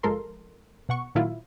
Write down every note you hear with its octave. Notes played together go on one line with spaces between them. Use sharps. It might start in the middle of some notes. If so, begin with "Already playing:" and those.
G1 F3 G#3 A4 A#4 C6
B2 F#5 C#6
A#2 D#3 F#3 E4 F4